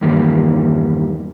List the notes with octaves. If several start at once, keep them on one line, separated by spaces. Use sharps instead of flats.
E2 G2 D#3 G3 A#3